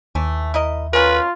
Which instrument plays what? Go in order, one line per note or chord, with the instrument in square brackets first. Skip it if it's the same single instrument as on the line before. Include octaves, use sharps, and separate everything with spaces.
[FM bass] D#2 [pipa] E3 A3
[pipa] E4 A#4 D#5
[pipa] B2 C#4 A#4 [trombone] F4 [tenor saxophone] B4